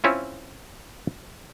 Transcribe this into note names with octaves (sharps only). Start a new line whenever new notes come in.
C4 C#4 E4 F4